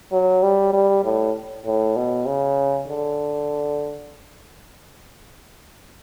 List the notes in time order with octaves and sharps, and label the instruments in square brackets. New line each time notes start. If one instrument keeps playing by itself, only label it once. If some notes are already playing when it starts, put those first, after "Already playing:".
[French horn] F#3
G3
G3
A2
A2
B2
C#3
D3